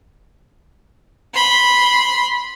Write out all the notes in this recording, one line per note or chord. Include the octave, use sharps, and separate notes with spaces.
B5 C6